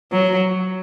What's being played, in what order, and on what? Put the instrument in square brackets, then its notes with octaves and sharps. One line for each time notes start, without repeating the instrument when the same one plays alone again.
[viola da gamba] F#3